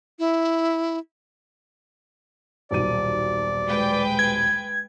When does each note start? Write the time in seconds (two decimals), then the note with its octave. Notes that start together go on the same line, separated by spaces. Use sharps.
0.19 E4
2.71 D#1 B1 D5 D#7
3.66 G#3 B4 G5
4.19 G#6